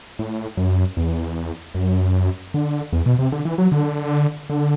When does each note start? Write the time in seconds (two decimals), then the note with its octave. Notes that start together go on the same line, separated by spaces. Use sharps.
0.19 A2
0.57 F#2
0.97 E2
1.75 F#2
2.54 D3
2.93 E2
3.06 B2
3.19 C3
3.32 D3
3.45 E3
3.58 F#3
3.72 D3
4.50 D3